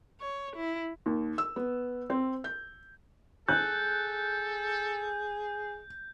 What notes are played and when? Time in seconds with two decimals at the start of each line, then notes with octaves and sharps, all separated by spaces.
0.20 C#5
0.56 E4
1.06 D#2
1.38 E6
1.56 B3
2.10 C4
2.44 G6
3.49 G#4 A4 F#6 G6